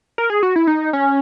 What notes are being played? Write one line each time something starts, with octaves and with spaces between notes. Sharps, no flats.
A#4
G#4
F#4
E4
D#4
C#4